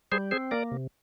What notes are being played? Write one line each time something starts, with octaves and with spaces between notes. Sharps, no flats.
G3 G#4 C5
C4 G#4 C5
A#3 A#4 D5
C3